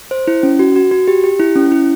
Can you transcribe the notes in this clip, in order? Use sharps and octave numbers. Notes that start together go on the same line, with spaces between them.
C5
E4
C#4
F#4
F#4
F#4
G4
G4
E4
C#4
E4